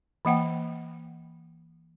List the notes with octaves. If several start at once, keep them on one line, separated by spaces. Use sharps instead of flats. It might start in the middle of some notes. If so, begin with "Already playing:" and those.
E3 A#3 F#5 G5